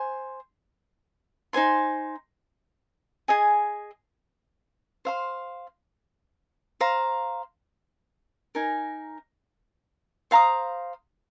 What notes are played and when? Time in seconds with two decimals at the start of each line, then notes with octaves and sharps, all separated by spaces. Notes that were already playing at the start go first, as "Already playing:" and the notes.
Already playing: C5 G#5 C6
1.53 D#4 C5 G#5 C6
3.28 G#4 D#5 G#5
5.05 C5 F5 C6
6.81 C5 F5 A#5
8.55 D#4 A#4 G#5
10.31 C5 F5 A#5 D#6